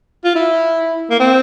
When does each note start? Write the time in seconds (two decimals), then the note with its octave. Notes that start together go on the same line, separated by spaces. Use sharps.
0.25 F4
0.35 E4
1.10 A#3
1.20 C4